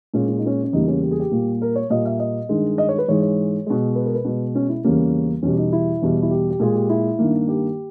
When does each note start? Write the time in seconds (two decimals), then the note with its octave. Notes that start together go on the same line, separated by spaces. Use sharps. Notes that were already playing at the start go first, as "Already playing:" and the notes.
0.14 A#2 G#3 C#4
0.28 C#4
0.38 D#4
0.46 C#4
0.64 C#4
0.73 E2 C#3 G3 A#3 D#4
0.88 C#4
1.02 G4
1.11 G#4
1.20 G4
1.31 A#2 G3 A#3
1.62 A#4
1.75 C#5
1.90 A#2 G3 A#3 D#5
2.05 E5
2.20 D#5
2.49 G2 D#3 G#3
2.78 D#5
2.89 C#5
2.98 B4
3.08 G#2 E3 G#3 C#5
3.22 C#5
3.66 B2 G#3
3.95 B4
4.05 A#4
4.15 B4
4.25 B2 G#3
4.55 C#4
4.69 E4
4.84 E2 C#3 G3 A#3 C#4
5.43 E2 B2 G3 C#4
5.57 D#4
5.72 E4
6.02 E2 B2 G3
6.22 E4
6.31 G4
6.50 G4
6.60 A#2 G#3 G#4
6.75 G4
6.90 E4
7.19 G2 D#3 A#3
7.48 G4